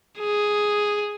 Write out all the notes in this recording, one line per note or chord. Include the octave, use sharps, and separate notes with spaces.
G#4